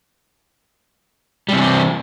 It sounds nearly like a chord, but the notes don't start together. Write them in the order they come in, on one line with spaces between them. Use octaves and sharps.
G3 C3 E3